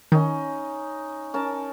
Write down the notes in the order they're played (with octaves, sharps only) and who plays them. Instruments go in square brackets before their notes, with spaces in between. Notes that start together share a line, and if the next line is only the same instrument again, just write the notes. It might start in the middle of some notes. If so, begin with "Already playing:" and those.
[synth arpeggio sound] D#3 [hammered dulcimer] C#4 D#4
[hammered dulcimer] C#4 A#4 A5